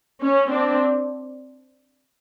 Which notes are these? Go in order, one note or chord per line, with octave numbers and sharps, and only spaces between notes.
C#4
C4 D4